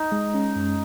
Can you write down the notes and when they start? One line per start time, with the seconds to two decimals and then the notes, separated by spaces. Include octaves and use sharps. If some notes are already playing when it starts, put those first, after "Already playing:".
Already playing: D#4
0.12 G#3
0.34 C#4
0.55 F#2